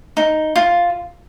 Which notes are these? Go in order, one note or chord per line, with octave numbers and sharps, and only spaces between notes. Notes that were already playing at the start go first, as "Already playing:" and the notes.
D#4
F4